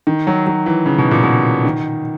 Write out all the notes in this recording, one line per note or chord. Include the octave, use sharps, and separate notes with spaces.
D#3
F#3
F#3
E3
C#3
B2
A#2
B2
D#3